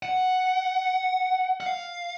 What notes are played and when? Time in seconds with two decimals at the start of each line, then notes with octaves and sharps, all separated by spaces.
0.03 F#5
1.60 F#5
1.66 F5